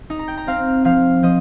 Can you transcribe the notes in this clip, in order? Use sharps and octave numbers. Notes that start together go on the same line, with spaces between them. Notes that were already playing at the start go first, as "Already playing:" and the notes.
D#4
A#5
G5
A#5
C4 F5
F3 F5
F3 D#5